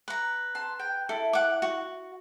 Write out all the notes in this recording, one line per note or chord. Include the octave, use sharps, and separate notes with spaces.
B4 A#5
A5 C6
G5
E4 A4
F#5 D6
F#4